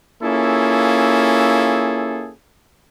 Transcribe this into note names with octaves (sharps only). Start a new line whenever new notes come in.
A#3 C#4 E4 F4 G#4 A4